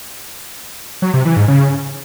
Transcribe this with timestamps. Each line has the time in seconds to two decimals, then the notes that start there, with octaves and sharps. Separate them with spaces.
1.02 F#3
1.14 C3
1.25 E3
1.37 G#2
1.48 C#3